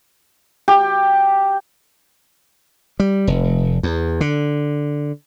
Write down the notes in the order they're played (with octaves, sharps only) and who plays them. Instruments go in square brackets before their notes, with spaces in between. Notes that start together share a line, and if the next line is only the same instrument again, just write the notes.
[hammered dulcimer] G4
[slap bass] G3
F1
E2
D3